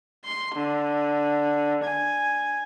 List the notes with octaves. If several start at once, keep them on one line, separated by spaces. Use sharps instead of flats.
C6
D3
G#5